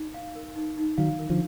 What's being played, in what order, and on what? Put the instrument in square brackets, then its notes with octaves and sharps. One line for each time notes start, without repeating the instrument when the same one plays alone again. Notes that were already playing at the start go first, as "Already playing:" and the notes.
Already playing: [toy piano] D#4
F5
A#4
D#4
D#4
[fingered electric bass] D#3 F#3 [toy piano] F5
[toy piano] A#4
[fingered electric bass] D3 F3